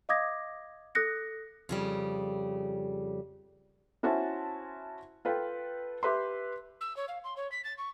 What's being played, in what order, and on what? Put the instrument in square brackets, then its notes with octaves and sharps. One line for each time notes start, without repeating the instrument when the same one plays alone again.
[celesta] D#5 F5 D6 D#6 G#6 A#6
A4 D#6 F#6 A#6 C#7
[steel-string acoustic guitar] F2 C#3 G3
[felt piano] C#4 E4 F#4 C5 E5 A5
F4 A4 B4 G5
G4 B4 E5 C6
[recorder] E6
C#5
F5
C6
C#5
B6
A6
C#6